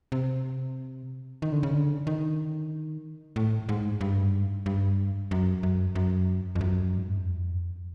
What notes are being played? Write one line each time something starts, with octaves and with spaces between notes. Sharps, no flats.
C3
D#3
D3
C#3
D3
D#3
A2
G#2
G2
G2
F#2
F#2
F#2
F2
F#2
G#2
G2
F#2
F2